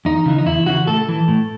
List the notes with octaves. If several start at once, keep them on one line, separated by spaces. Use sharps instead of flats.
E2 D#4
C#3 E3
D#4
E2 E4
C#3 E3 F#4
A2 A4
E3
A2